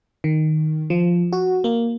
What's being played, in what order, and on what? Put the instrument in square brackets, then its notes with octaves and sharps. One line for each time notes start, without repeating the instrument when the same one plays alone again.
[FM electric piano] D#3
F3
F#4
A#3